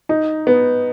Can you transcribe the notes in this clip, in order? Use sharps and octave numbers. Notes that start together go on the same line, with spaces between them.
D#4
B3